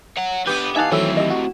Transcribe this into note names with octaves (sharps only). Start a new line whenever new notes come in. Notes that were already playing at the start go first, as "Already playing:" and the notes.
C#5 F#5
D3 B3 G4 B4 G6
E3 D#4 E5 F5 G#5 A5 F#6
A2 D#3 E3 F#3 C4 A4 C#5 E5
G4 D#5
F#4